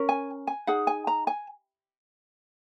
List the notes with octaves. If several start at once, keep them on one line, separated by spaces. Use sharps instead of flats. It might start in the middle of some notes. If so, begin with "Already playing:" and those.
Already playing: C#4 A#4
G#5
G#5
D#4 G#4 F#5
G#5
A#5
G#5